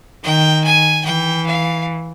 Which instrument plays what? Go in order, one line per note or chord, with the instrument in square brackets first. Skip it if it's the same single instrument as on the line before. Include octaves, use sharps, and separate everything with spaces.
[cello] D#3 [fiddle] G5
[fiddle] G#5
[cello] E3 [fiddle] G5
[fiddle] F5